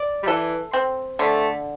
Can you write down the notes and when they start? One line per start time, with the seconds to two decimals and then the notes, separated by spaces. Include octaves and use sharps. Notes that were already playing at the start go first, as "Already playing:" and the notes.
Already playing: D5
0.23 G3
0.27 E3 A4
0.73 C4
1.19 D3 A3